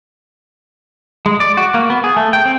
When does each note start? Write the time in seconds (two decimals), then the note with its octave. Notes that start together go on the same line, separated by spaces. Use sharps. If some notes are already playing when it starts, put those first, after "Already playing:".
1.26 G#3
1.40 D5
1.57 F#4
1.74 A#3
1.90 B3
2.04 G#4
2.17 A3
2.33 G5
2.45 C4